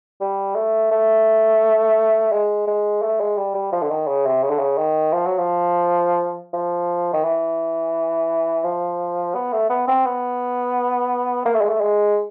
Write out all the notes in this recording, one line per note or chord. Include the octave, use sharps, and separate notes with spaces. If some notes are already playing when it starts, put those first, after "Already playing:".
G3
A3
A3
G#3
G#3
A3
G#3
G3
G3
F3
D3
D#3
C#3
C3
C#3
D3
C#3
D#3
F3
F#3
F3
F3
D#3
E3
F3
B3
A3
B3
C4
B3
A#3
A3
G#3
A3
G#3